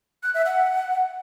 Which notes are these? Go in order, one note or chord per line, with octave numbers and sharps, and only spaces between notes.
F#6
E5
F#5